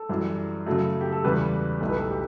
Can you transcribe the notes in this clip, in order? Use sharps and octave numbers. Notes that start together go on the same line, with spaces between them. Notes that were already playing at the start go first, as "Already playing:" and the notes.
Already playing: A4
F#2 E3 G3
F#2 C#3 F#3 A3
G4
A4
E2 C#3 G3 B4
B1 A2 G3 A4
B4
A4
G4